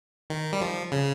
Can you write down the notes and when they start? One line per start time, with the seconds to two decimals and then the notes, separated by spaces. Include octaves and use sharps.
0.30 D#3
0.53 G3
0.61 F3
0.92 C#3